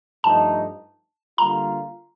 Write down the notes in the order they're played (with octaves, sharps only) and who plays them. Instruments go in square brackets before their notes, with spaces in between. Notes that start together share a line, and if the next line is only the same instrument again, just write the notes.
[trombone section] G2 F3 A3 D#4 [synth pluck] A5
[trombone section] D3 G3 A#3 F4 [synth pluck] A#5